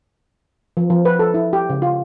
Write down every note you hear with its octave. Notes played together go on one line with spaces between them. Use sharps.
F3
F3
B4
A4
E4
G4
C#3
F4